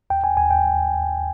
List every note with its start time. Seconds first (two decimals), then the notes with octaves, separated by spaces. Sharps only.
0.10 D#2 G5
0.24 G#5
0.37 D#2 G#5
0.51 G5